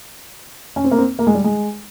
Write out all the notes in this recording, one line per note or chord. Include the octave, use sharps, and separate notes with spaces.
C#4
C4
A#3
C4
A#3
G#3
G3
G#3